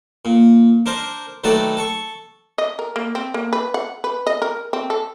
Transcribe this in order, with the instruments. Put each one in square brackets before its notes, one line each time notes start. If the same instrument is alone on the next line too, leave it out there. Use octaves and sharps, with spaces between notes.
[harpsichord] A#2
D4 A#4 C5
D#3 F#3 A3 A4 B4 D5
A4 C#6
[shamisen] D#5
A#4
A#3
C4
A#3
B4
F#5
B4
D#5
A#4
C4
A4